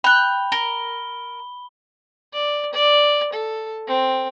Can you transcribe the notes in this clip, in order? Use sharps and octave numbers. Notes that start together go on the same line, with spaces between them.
G5 B5 F#6
A#4 G7
D5
D5
A4
C4